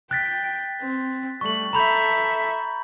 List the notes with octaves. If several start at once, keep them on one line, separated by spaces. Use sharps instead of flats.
G5 F#6 A6 B6
C4
G3 A3 C#6 F#7
A4 E5 A#5 B5 G6